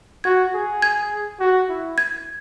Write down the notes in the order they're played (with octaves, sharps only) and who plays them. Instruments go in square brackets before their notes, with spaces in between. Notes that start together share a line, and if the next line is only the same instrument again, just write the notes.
[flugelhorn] F#4 [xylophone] G#6
[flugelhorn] G#4
[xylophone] G#6
[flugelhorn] F#4
E4
[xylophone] G#6